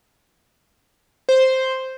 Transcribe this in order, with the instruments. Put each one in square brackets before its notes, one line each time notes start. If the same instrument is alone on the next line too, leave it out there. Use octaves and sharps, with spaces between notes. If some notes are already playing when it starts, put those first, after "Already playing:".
[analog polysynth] C5